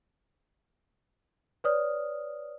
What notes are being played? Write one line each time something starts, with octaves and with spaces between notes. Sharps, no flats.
B4 C#5 D5 D#6 F6